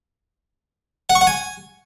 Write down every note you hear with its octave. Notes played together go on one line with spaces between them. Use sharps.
F#5
C#6
F#5
G#5